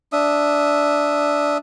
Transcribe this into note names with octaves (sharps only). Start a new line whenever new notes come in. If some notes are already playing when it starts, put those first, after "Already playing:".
D4 E5 D#6